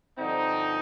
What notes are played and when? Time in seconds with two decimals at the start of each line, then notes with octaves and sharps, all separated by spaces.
0.18 G2 D3 F3 C4 D#4